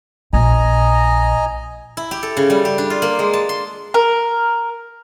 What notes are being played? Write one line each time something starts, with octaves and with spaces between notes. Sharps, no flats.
A#1 D#5 G#5 A#5
E4
G4
A4
C#3
G3
G4
D4
F4
A#3
G#3
A5
C6
A#4